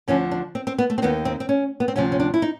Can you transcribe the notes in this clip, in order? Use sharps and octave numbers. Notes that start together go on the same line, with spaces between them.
D2 D3 F3 C#4
D4
C4
C4
B3
A3
C4
D#2 D#3 B3
C4
C4
C#4
B3
C4
D2 C3 F3 C#4
C#4
D4
E4
D#4